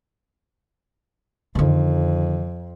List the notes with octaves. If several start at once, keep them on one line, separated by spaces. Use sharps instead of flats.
F2 D3 D#3